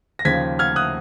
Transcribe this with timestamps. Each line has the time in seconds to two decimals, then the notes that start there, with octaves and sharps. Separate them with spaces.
0.19 A#6
0.25 D#2 C#3 F3 G#6 B6
0.59 F6 G#6
0.76 D#6 F#6